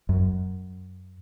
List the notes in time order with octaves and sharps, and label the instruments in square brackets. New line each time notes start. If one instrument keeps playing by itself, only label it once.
[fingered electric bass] F#2